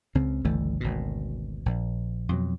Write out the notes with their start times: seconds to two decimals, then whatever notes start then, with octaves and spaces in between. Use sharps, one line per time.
0.15 C#2 C#3 C4
0.45 G1 C#2 E3 A3
0.80 G#1 D2 B2
1.66 A#1
2.29 F2 B2 F#3